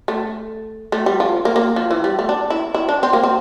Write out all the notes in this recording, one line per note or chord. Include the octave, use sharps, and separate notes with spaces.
A3
A3
G3
F3
A#3
A#3
F3
E3
G3
A3
D4
E4
E4
D4
C4
A#3
C4